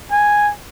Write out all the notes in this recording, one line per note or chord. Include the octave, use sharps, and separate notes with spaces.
G#5